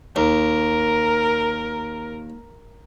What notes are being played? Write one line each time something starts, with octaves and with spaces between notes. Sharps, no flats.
D#2 A#4